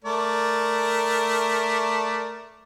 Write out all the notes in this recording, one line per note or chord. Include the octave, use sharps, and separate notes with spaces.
A3 A#4 D5